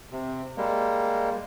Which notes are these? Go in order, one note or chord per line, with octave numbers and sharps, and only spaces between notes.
C3
G3 G#3 A#3